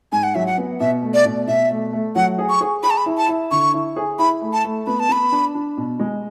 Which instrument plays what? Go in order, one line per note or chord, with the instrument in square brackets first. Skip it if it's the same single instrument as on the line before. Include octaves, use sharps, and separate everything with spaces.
[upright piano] G#2 [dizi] G#5
[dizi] F#5
[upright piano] F#3 [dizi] E5
[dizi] F#5
[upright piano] B3
[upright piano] B2 [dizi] E5
[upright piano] A3
[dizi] D5
[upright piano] B2
[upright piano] B2 [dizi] E5
[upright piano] A3
A3
[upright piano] F#3 [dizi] F#5
[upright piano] G#4
[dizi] C#6
[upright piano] G#4
[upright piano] G#4 [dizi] B5
[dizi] A5
B5
[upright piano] E4
[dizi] A5
[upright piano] E4
[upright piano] D3 [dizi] C#6
[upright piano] E4
G#4
[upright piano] E4 [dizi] B5
[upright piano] A3
[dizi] A5
[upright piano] A3
[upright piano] B3 [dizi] B5
[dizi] A5
[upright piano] B3 [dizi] B5
[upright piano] D4
D4
B2
G#3